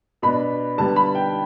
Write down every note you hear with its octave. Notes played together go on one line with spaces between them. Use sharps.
B2 B3 D4 B5
D3 G3 B3 A5
B5
G5